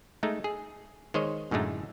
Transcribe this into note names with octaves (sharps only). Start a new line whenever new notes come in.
G#3 A3 D#4
G#4
D#3 G#3 C5 C#5 D#5
F#2 A2 D3 G#3 A3 D#4